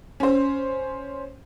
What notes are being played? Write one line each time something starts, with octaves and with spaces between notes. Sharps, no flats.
C#4 C5